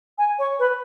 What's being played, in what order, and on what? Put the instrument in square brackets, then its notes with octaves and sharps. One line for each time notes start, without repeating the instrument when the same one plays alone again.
[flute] G#5
C#5
B4